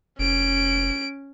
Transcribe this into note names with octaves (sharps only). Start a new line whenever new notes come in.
F1 C#4 D7